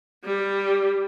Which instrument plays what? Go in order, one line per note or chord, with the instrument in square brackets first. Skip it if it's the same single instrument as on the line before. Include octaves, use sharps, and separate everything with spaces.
[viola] G3